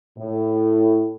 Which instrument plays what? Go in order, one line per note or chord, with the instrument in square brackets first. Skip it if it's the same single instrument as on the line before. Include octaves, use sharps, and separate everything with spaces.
[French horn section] A2